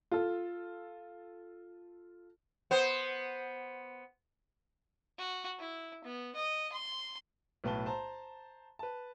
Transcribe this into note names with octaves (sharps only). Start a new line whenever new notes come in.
F4 A4
B3 C5
F#4
E4
B3
D#5
C6
B1 A2 B4 A5 G7
C5 A5 A#5
B4 A5